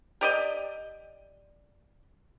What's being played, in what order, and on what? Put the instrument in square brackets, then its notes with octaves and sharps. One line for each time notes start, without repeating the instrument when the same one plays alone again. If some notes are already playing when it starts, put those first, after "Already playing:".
[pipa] G4 D5 D#5